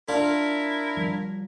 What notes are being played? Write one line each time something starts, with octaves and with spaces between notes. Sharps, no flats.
D4 E4 F4 A#4
F3 G3